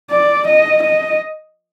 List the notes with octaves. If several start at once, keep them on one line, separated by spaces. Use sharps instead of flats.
D5
D#5
D#5